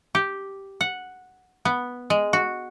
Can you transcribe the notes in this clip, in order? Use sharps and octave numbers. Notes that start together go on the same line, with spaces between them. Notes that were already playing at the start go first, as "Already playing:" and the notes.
G4
F#5
B3
G#3
F#4